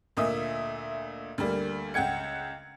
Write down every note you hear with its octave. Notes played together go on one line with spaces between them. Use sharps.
D2 A#2 D#5 E5 D#6
D2 G3 A#3
C#2 F#5 G5 G#6 C#7